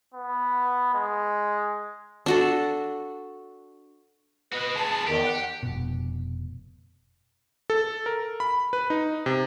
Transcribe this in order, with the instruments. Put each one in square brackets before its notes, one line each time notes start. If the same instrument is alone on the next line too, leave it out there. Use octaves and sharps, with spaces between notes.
[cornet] B3
G#3
[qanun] D4 F#4 A4
[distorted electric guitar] F#4 D#5 [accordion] B4
[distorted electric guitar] G#3 B3 [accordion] A5
[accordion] E2 D#3 [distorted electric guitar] G4
[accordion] F#5
[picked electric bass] F1 B2
[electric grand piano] A4
A#4
B5
B4
D#4
C3